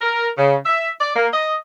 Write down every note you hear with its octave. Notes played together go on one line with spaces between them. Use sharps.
A#4
C#3
E5
D5
A#3
D#5